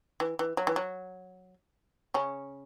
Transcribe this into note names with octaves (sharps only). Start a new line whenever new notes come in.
E3
E3
F#3
E3
F#3
C#3 C#4